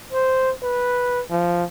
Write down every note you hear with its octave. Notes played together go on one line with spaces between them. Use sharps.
C5
B4
F3